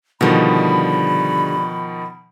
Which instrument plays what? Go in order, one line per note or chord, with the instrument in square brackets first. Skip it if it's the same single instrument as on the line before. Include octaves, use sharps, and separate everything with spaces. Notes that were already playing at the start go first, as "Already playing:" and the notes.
[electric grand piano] B2 D#3 F3 [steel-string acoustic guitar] D3 G3 [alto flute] B5